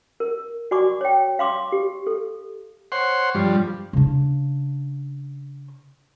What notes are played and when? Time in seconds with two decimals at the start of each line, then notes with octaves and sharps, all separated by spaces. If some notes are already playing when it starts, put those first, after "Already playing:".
0.20 A#4
0.71 F#4 D5 G#5 C#6 D6
1.01 C#5 G5
1.39 F5 C6 D6
1.72 G4
2.07 A4
2.92 C5 C#5 F#5 C6
3.35 G2 F3 G3
3.93 C#3 D4